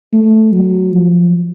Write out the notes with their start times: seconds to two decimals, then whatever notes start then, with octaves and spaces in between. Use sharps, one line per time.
0.13 A3
0.52 F#3
0.92 F3